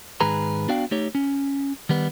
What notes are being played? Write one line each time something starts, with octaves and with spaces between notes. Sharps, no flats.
G#2 D#3 G#4 B4 A#5
B3 D4 F#4 D5 F5 G5
A3 D#4 G4 C#5
C#4
D#3 G3 B3